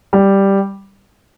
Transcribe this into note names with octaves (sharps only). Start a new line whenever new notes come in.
G3